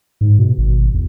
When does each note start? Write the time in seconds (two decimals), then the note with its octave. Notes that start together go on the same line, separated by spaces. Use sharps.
0.21 G#2
0.39 B2
0.58 G#1
0.94 E2